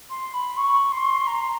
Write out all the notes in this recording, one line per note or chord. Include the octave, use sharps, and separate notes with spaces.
C6
B5
C#6
C6
A#5